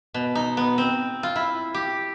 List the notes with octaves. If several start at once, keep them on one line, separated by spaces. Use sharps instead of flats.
B2
D#4
B3
C4
F4
E4
G4